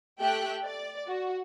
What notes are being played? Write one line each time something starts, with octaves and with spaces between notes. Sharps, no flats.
A3 G4 E5 G5 F#6
D5
F#4